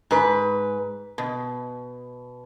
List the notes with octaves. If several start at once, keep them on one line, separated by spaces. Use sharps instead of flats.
G#2 B4
B2